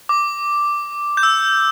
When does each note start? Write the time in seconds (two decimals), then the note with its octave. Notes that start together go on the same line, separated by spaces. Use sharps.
0.09 D6
1.17 G6
1.23 E6